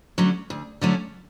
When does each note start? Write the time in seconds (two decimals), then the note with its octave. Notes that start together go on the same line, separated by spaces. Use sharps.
0.18 D3 F#3 A3 C#4
0.50 D2
0.81 D3 F#3 A3 C#4